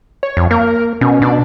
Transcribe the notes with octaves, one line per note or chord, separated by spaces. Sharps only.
C#5
F2
A#3 A#4
B2 C#4
B2 D4